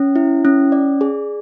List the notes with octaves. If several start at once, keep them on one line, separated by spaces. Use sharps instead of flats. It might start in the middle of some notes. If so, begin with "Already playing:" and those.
Already playing: C#4
E4
C#4
D5
G#4